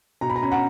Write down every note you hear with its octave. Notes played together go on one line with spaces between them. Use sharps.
B2 A#5
B5
A#5
C#4 B5
F#5 A#5